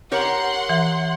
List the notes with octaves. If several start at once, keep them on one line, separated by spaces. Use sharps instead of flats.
G4 A#4 C#5 F#5 C6
E3